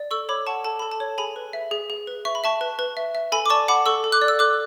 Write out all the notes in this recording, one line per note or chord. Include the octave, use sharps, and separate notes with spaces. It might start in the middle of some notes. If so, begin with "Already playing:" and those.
Already playing: D5
A4 C#6 E6
C#5 B5 D6
F#5 A5 C#6
A4 A5
A4 B5
A5
C#5
G#4 G#5 B5
B4
E5
G#4
G#4
B4
E5 C#6
B5
E5 A5 C#6
B4
B4
E5
E5
A4 G#5 B5
D6
D5 A5 C#6
F#5 B5 D6
A4 C#6 E6
A4
D6 F#6
D5
E6
A4 D6 F#6